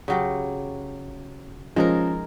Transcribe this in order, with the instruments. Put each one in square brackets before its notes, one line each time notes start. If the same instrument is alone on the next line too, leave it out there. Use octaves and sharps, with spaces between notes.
[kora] C#3 F#3 G4
[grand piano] F3 C#4 [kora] G#3 D#4 A#4